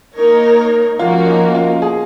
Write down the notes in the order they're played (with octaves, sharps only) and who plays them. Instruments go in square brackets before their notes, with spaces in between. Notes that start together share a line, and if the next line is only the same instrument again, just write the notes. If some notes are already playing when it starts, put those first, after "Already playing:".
[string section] A#3 D#4 A#4 C#5
[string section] F3 A#3 C#4 F#4 A#4 [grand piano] F4
[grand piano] D#4
F4
G#4